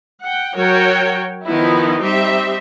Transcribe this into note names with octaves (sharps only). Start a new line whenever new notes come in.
F#5 G5
F#3 F#4 A#4 C#5 G5
D#3 F3 B3 D#4 E4
G3 C4 D#4 G4 E5